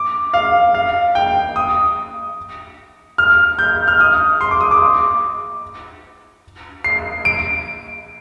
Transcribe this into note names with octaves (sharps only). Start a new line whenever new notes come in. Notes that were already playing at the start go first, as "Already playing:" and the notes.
Already playing: D6
F5
F5
G5
D#6
F6
G6
F6
D#6
C6
D6
D#6
D6
C7
D7